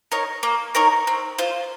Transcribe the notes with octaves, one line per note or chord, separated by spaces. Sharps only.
D#4 A#4 C#5
A#3
D#4 A#4 C#5
C4
F4 C5